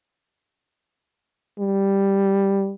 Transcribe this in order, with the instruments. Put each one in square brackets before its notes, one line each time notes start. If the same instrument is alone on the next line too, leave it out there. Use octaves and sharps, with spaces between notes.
[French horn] G3